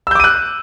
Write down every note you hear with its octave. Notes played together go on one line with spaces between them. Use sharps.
D6 E6 F#6 G6 D#7